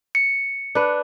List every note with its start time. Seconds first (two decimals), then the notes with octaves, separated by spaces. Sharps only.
0.15 C#7
0.75 D4 B4